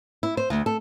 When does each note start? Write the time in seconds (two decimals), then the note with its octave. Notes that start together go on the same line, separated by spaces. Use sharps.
0.23 E4
0.37 C5
0.50 D2
0.66 A4